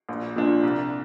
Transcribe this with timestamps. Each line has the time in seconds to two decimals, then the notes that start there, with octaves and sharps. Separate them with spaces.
0.09 A#1
0.36 A#2 F3 D4
0.63 C2